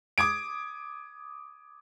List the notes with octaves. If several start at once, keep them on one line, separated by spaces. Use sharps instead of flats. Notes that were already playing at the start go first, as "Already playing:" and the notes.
D6 D#6 G#6 D7